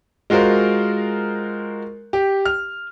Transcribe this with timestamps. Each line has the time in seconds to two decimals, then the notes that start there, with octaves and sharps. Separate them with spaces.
0.30 G#3 F4 F#4 A#4 C5
2.13 G4
2.45 F6